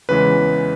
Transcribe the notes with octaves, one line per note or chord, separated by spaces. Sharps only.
E2 C#3 E3 G#3 B4